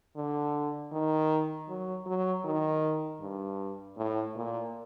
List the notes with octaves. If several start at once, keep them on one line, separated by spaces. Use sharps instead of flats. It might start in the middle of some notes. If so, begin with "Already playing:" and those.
D3
D#3
F#3
F#3
D#3
G2
A2
A#2